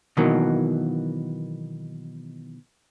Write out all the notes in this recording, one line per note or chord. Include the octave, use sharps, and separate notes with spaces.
B2 D#3 E3 F#3 A#3